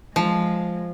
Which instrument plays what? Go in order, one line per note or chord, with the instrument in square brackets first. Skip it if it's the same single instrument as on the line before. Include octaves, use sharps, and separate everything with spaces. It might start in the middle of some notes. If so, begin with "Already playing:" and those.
[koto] F3 [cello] G#3